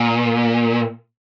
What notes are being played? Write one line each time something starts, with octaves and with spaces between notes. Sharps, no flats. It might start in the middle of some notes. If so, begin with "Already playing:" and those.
Already playing: A#2